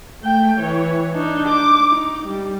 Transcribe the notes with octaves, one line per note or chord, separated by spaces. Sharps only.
A3 G5
E3 C#5
D4 D#4
D6
D#4
G3